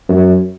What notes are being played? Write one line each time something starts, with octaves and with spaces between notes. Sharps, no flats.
F#2